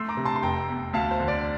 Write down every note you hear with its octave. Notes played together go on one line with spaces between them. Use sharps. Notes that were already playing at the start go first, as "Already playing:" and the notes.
Already playing: A3 C6 E6
A#5 D6
C3
A5 C6
C6
F1 G5 A#5
E2
D2 F5 A5
C5
D3
D5